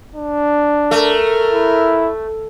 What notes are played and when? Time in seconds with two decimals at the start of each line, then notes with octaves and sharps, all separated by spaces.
0.15 D4
0.91 A3 A#4
1.53 E4